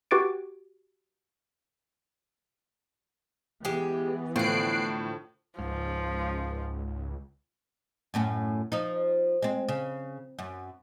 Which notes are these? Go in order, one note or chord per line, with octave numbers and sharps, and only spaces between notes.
F#4 G4 B4 D6 A6 D7
E3 G#3 B3 G4
A2 D3 F3 F#6 C7 D7
C#2 G#2 F3
F#2 A2 C#4
F3 D#4
G#3 C4
C#3
F#2